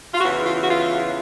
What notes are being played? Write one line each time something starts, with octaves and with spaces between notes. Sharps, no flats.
F4
E2 C#3 E3 F#4
F4
F#4
F4